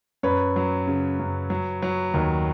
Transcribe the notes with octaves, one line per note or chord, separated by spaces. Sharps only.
F#2 B4 C#5
F#3
C#3
F#2
F#3
F#3
D#2